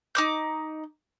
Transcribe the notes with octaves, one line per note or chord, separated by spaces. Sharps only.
D#4 D6 G6